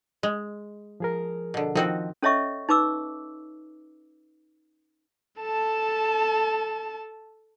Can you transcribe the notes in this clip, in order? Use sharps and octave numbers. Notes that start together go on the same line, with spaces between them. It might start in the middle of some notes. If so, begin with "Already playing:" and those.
G#3
F3 G#4 A#4
B2 D3
D#3 F3 C4 F#4 D#5
C#4 A4 C#5 D#5 E5 C#6
D#4 B4 D6 E6
A4 A5